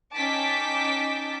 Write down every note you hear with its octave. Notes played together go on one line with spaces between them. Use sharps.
C#4 D#4 G5 A5 D6 B6